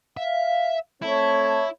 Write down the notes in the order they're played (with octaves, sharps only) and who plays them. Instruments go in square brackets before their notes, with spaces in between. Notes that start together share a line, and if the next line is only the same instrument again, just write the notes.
[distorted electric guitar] E5 [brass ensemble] F5
[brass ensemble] A3 C4 A5 [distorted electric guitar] E4 [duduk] C#5